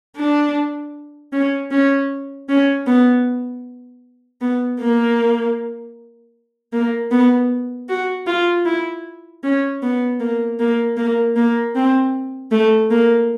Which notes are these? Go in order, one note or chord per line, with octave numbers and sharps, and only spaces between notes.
D4
C#4
C#4
C#4
B3
B3
A#3
A#3
B3
F#4
F4
E4
C#4
B3
A#3
A#3
A#3
A#3
C4
A3
A#3